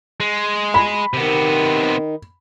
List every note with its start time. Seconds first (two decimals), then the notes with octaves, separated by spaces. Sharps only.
0.20 G#3
0.74 B5
1.14 C3 D#3 B3